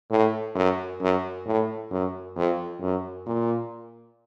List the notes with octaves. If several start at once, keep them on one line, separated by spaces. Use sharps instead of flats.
A2
F#2
F#2
A2
F#2
F2
F#2
A#2